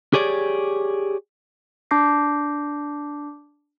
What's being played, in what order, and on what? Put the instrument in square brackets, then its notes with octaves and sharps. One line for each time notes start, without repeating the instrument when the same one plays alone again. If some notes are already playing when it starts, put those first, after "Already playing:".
[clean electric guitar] G4 G#4 C#5 D5
[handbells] D4 A5 D6 G6 A#6 C7